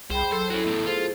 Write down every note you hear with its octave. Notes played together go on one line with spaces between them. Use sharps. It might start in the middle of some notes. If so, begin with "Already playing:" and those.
C2 G#4 C5 G5 B5
F#3 A4 C5
C#4 E4 F#4
E2 A2
F4 G#4 C5